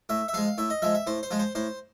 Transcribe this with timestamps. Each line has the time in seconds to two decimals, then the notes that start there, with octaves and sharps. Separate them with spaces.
0.09 A2 E5
0.28 E5
0.34 F3 G#3 F5
0.58 A2 E5
0.70 D#5
0.82 F3 G#3 E5
0.95 E5
1.07 A2 C5
1.23 C5
1.31 F3 G#3
1.39 C5
1.55 A2 C5